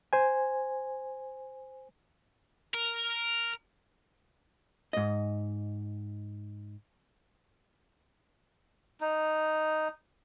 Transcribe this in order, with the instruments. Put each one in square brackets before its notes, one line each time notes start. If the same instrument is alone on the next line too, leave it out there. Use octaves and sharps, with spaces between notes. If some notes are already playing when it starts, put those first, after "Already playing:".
[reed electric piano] C5 G#5
[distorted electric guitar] A#4
[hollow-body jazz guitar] G#2 D#5
[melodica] D#4